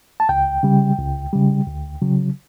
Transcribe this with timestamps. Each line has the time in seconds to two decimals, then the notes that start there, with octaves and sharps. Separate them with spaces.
0.20 A5
0.29 C#2 G5
0.63 C#3 G3
0.98 C#2
1.33 C#3 G3
1.67 D2
2.01 C#3 F#3